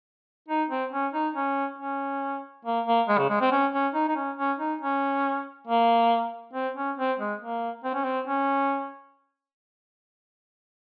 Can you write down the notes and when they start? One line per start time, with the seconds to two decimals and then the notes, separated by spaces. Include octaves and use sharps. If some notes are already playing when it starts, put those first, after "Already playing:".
0.48 D#4
0.70 C4
0.92 C#4
1.13 D#4
1.35 C#4
1.78 C#4
2.65 A#3
2.86 A#3
3.08 G#3
3.18 C#3
3.29 G#3
3.41 C4
3.52 C#4
3.73 C#4
3.94 D#4
4.08 D#4
4.16 C#4
4.37 C#4
4.59 D#4
4.81 C#4
5.67 A#3
6.53 C4
6.76 C#4
6.98 C4
7.19 G#3
7.40 A#3
7.84 C4
7.94 C#4
8.05 C4
8.27 C#4